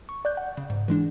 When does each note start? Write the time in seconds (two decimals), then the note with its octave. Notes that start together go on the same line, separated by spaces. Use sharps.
0.09 C#6
0.25 D5 F#6 G6
0.37 F#5
0.57 C#3
0.70 G#2
0.88 E3 G#3 D4